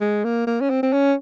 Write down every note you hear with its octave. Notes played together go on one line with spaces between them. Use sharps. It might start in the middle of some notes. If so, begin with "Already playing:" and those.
G#3
A#3
A#3
C#4
C4
C4
C#4